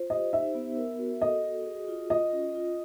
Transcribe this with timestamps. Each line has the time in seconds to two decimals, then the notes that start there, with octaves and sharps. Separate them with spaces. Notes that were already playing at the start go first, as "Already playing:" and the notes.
Already playing: F4 C5
0.10 G4 D#5
0.33 D#4 E5
0.55 B3
0.77 A#4
0.99 F#4
1.22 A4 D#5
1.44 F#4
1.66 G#4
1.88 F4
2.10 F4 D#5
2.33 C#4
2.55 F4